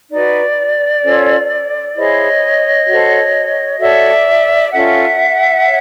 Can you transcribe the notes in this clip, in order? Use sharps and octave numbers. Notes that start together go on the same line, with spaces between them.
D#4 F#4 B4 D5
C#4 F4 A4 C5
E4 G#4 C5 C#5 D#5
F#4 A4 C5
F#4 A4 C#5 D5 E5
C#4 F4 A4 E5 F#5
C#5